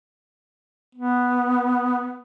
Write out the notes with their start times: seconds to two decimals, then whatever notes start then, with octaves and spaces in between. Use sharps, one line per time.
0.95 B3